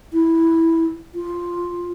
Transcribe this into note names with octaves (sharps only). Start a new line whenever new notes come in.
E4
F4